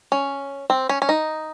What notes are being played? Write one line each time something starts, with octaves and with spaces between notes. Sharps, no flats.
C#4
C4
C#4
C#4
D#4